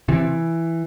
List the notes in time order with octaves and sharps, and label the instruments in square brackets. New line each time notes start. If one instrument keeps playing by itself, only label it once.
[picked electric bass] C3 E3